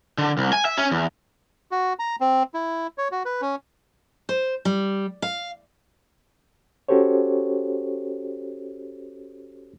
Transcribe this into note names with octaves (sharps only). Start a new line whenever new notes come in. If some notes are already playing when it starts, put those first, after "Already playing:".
D3
C2
G#5
E5
C#4
E2
F#4
A#5
C4
E4
C#5
F#4
B4
C#4
C5
G3
F5
C#4 F#4 G4 A4 C5 C#5